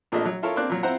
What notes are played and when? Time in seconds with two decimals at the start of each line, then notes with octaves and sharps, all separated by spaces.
0.12 A#1 A#2 F3 A3 D4 D#5
0.25 F#3
0.43 E4 F4 A4 A#4 C#5
0.56 A#3 C4 D4 D6 F#6
0.70 A#2 F#3
0.83 C4 E4 F4 C5 F#5 A#5